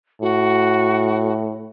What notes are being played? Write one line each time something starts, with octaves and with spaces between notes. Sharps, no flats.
A2 F#4